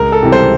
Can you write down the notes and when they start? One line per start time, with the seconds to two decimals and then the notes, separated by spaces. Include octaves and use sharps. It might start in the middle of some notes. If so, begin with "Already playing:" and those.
Already playing: C#2 A#4
0.12 A4
0.23 C3 E3 G3
0.32 C5